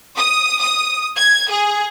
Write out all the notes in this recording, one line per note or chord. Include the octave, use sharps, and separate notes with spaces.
D#6
D#6
G#6
G#4